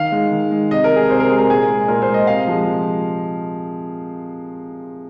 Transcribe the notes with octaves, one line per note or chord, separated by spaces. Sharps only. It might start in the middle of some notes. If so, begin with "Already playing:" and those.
Already playing: D#3 F5
G#3
D#3
G#3
C3 D#5
A#4
G#3
G#4
C3 C5
A#4
G#3 G#4
A#4
A#2 G#4
G#3
A#2 A#4
C5
G#3
D#5
C3 F5
F3 G#3